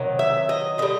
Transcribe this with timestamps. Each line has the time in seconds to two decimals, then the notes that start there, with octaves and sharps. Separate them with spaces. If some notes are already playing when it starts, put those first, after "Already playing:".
Already playing: C3 D#3 F#3
0.19 E5
0.49 D#5
0.78 D3 G3 D#5